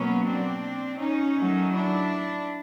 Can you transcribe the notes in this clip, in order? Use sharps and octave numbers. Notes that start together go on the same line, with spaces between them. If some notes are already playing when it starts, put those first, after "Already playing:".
Already playing: B2 F#3 A#3 B3 C#4
C4 D4
C#4 D#4
D#3 F#3 A3
D4 E4